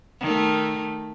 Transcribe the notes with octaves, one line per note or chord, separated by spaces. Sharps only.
D#3 A3